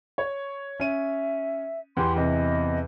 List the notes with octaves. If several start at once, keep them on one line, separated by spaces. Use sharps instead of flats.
C#5
C#4 E5 D#7
E2 G4 C6
E2 C3 D#5